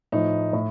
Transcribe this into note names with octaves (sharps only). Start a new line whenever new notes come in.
A2 F3 D#4
A2